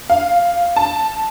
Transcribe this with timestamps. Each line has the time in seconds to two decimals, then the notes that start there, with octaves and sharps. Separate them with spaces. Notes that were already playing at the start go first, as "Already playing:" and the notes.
0.10 F5
0.76 A5